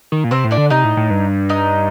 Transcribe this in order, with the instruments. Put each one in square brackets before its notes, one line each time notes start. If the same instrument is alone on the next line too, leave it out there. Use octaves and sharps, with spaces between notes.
[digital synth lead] D#3
A#2
[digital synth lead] C3 [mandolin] C4 C5
[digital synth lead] A2
[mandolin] D4 D5
[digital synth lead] D3
[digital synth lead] C3 [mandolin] D#4 D#5
[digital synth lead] A2
A2
G2
[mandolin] D#4 D#5